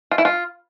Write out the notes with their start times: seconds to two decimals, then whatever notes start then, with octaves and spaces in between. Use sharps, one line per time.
0.11 F4
0.18 E4
0.25 F4